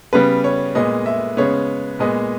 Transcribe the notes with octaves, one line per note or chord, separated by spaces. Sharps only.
C#3 G3 B3 B4
C#5
A#2 G#3 B3 D#5
E5
C#3 G#3 B3 C#5
A#2 G#3 B3 D#5